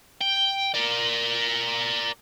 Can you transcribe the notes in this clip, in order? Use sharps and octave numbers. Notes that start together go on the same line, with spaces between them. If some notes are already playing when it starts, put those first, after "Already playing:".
G5
A#4 D5